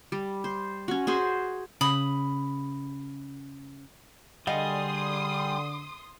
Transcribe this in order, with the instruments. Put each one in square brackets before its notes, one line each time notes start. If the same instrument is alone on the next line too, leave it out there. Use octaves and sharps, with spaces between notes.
[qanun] G3
C5
C#4 F#4
F#4 G#4 C5
[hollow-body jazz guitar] C#3 [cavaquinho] B5 D#6
[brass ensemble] D3 [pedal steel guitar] G3 G#4 [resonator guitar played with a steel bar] D#5 F5 F#5 [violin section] C6 D#6